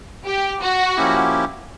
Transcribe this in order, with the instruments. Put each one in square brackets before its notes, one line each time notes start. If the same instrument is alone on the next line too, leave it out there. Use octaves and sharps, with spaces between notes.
[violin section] G4
F#4
[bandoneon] F3 A#3 C#4 E4 G4